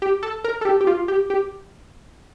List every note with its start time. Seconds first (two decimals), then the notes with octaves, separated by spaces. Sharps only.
0.02 G4
0.23 A4
0.44 A#4
0.61 A4
0.65 G4
0.81 G4
0.87 F4
1.08 G4
1.30 G4